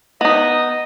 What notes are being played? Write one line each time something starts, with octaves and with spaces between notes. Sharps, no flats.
B3 D#4 D#5